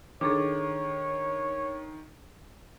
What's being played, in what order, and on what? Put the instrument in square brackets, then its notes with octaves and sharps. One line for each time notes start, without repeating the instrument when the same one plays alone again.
[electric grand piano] D#3 [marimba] D4 G#4 A4 [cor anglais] C#5